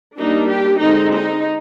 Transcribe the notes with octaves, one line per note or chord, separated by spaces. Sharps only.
G3 A#3 D4 D#4
G4
D3 G#3 C4 D#4
D#4